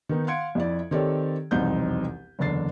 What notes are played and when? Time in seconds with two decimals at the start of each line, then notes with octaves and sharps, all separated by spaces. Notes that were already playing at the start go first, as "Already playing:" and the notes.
0.09 D#3 B3 D#4
0.27 F5 F#5 C6 G#6 C#7 D7
0.55 F2 E4 D5
0.91 D#3 C4 G4 A4 C#5 D5
1.51 E1 C2 F2 C4 D#4 G6
2.39 F#1 E2 D3 D4 A6 C7